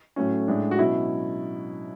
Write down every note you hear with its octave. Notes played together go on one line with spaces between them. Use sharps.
A2 F#3 A3 C#4
A2 G#3 D4
F#4
B2 F#3 C#4 E4